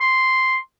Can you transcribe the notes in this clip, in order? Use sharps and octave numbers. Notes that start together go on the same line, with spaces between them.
C6